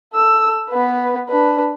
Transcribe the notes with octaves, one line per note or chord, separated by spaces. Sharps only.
A4 E6
B3 B4
D4 B4